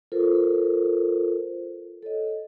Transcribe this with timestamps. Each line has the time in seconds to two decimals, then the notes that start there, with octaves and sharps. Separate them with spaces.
0.12 F4 A4 A#4 C5
2.03 A4 C#5 D#5